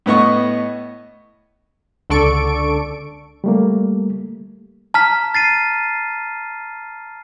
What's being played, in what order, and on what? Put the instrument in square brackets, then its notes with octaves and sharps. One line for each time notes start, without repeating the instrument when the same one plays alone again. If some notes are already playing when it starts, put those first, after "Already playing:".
[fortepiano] A2 B3 D#5 C#6
[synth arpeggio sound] C#2 D3 A4 D5 C#6 D7
[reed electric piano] G3 A3 A#3
[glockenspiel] A5 A#5 F6 B6
A6 C7 D#7